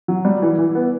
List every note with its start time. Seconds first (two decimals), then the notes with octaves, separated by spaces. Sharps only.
0.08 F#3
0.25 G3
0.42 E3
0.58 E3
0.75 B3